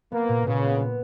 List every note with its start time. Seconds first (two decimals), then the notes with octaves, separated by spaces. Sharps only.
0.12 A#3 B3
0.29 A#2
0.47 A#2 C#3
0.64 B3
0.81 B3